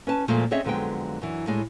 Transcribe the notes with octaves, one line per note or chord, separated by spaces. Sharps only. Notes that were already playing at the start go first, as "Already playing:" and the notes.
C#4 B4 A5
F2 A#2 F3 G#3 A3 F4
C4 C#4 G#4 C#5 D#5 E5
F2 D3 F#3 G#3 B3 G5
F#2 E3
A2 G3 G#3